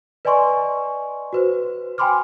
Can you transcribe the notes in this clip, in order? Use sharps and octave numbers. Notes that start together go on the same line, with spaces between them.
B4 D5 D#5 G#5 C6 C#6
F#4 B4 C5
G5 G#5 B5 C6 D6 F6